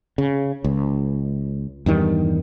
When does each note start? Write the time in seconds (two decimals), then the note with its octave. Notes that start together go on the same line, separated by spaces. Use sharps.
0.18 C#3
0.64 C#2
1.86 E2 G2 D#3 G3